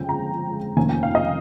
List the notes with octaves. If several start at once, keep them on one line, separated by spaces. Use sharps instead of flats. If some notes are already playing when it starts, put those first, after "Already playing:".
Already playing: G1 F2 C#3 G#3 C#4 G5
A#5
F1 F2 D#3 A#3 C#4 G#5
G5
F5
D#5